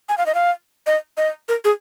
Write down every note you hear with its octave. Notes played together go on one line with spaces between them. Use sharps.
G#5
F5
D#5
F5
D#5
D#5
A#4
G#4